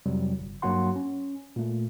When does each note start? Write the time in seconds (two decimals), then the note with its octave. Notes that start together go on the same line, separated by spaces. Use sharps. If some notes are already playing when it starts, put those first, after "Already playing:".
0.06 F2 C3 F#3 G3
0.39 G1
0.62 G2 F#3 A#3 F#4 F#5 C6
0.96 C#4
1.56 A#2 A3